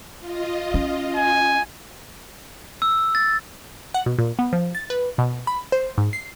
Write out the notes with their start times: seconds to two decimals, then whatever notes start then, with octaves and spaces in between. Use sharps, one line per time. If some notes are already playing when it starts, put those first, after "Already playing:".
0.20 F4 D#5
0.74 C#4
1.16 G#5
2.82 E6
3.15 A6
3.94 F#5
4.06 B2
4.19 A#2
4.39 B3
4.53 F3
4.75 A6
4.90 B4
5.18 B2
5.47 B5
5.72 C5
5.98 G#2
6.13 C7